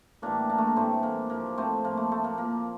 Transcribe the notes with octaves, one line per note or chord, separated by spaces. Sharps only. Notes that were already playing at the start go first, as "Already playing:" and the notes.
A2 E3 G3 A#3 D4
A#3 D4
A3
A#3
A2 E3 G3 A3 C4
A#3
A2 F3 A#3
A3 C4
A2 F3 A#3
A3
A3
A#3
A#2 F3 A#3